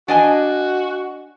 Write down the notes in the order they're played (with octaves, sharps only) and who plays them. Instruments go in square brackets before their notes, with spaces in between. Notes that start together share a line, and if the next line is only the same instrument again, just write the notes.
[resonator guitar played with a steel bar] D4 D#5 G#5 [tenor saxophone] F#4